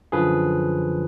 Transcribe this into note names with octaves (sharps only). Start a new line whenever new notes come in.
F#2 D3 F3 G#4 B4